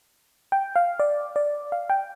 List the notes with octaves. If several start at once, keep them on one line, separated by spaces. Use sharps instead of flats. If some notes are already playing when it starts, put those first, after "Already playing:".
G5
F5
D5
D5
F5
G5